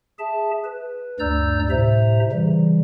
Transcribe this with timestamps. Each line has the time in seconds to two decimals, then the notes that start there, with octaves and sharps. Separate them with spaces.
0.19 G#4 E5 A5
0.64 B4
1.20 D2 G2 D5 A#5 E6 G6
1.70 A2 C3 C5 E5 A#5
2.32 C#3 E3 G3